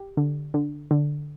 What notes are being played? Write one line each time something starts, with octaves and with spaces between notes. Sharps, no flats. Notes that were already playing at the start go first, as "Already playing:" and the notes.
Already playing: G4
D3
D3
D3